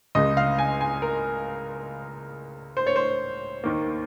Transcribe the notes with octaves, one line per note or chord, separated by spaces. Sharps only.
C#2 C#3 G#3 D#5
F5
G#5
G#5
A#4
C5
C#5
C5
D#2 D#3 A#3